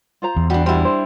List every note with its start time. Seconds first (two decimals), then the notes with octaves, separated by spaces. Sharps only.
0.22 F4 C5 A#5
0.36 E2
0.50 G3 D4 F#4
0.66 G3 E4 F#4 C5
0.85 C5